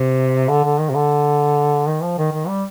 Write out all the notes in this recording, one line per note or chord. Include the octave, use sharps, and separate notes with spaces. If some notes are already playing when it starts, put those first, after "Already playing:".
Already playing: C3
D3
D3
D#3
C3
D3
D#3
F3
D#3
D#3
G3